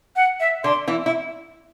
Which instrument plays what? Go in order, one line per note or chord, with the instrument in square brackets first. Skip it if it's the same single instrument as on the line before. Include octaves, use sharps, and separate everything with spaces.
[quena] F#5
E5
[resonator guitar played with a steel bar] D3 D4 [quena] C6
[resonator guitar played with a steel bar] E3 E4
E4